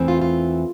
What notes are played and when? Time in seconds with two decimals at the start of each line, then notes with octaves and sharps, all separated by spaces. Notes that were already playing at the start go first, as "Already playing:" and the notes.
Already playing: E2 E3 A3 C4
0.08 F4
0.22 F4